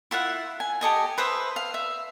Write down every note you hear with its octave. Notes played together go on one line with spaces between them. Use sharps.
E4 F4 E5 F#5
G#5
G4 A4 D#5 G#5
B4 C5 E5 D#6
F5
E5